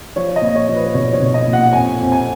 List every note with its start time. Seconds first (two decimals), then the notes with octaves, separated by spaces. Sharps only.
0.16 F3 C#5
0.36 D#5
0.42 A#2
0.55 C#5
0.69 F3
0.75 B4
0.86 B4
0.95 B1 C#5
1.13 C#5
1.20 B1
1.34 D#5
1.47 A#2
1.53 F#5
1.63 F#5
1.72 F2 G#5
1.99 F2
2.12 G#5